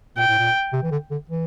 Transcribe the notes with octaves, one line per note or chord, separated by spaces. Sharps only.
A#2 G5
A2
A#2
C3
E3
D3
D3
E3